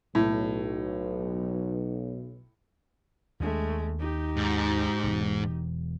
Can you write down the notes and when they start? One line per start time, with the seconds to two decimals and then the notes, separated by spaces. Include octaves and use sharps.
0.15 B1 A2
3.40 D#2 G#3 A3 D4
4.00 D#4 G4
4.37 G#2
5.04 E1 E2